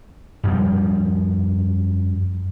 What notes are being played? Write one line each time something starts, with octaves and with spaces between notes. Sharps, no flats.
F#2 F3 G3